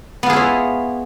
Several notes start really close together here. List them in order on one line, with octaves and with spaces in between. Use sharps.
B3 F4 G#4 E4 C#5